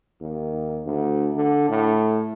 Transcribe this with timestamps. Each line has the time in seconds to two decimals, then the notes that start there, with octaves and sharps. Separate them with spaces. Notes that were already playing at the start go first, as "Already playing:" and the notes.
0.21 D#2
0.86 D2
1.36 D3
1.69 A2